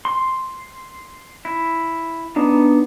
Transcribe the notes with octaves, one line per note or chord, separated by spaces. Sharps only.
C6
E4
B3 D4 D#4